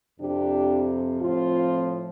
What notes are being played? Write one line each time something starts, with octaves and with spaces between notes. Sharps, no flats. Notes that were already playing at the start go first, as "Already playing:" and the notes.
F2 C3 F3 D4 G4
A2 F3 C4 F4